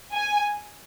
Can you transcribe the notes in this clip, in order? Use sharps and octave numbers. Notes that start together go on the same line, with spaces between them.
G#5